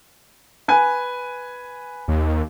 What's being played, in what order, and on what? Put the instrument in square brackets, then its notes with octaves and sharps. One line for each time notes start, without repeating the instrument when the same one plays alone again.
[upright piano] B4 G#5
[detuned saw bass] D#2